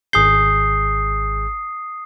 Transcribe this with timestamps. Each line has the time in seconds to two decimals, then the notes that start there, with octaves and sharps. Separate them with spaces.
0.13 G#1 G#4 D#6 G6 C7